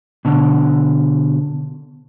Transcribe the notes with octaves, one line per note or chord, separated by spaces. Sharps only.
B2 D3